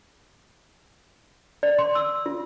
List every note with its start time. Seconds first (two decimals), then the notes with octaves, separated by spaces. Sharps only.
1.63 D5
1.79 C6
1.95 E6
2.26 F4